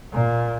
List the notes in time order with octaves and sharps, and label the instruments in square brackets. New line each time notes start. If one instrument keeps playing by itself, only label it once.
[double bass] A#2